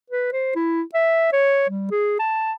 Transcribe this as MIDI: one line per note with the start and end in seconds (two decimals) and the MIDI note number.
0.10 0.31 71
0.33 0.55 72
0.55 0.82 64
0.94 1.32 76
1.33 1.66 73
1.69 1.87 55
1.91 2.16 68
2.19 2.53 81